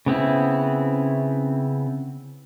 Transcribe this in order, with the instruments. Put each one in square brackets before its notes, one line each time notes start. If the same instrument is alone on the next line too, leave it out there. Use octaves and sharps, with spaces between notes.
[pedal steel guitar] C#3 B3 C4 E4